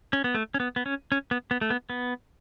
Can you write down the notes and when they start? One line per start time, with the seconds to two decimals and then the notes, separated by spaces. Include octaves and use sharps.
0.13 C#4
0.24 B3
0.35 A3
0.54 C#4
0.60 B3
0.76 B3
0.86 C#4
1.12 C#4
1.31 B3
1.51 B3
1.61 A3
1.70 B3
1.90 B3